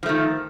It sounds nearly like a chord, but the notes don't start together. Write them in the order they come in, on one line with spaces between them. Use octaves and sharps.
F3 A3 D#3